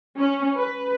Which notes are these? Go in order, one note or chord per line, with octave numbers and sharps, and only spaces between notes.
C#4
B4